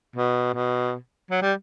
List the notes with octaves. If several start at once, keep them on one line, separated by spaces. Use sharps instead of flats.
B2
B2
F#3
G3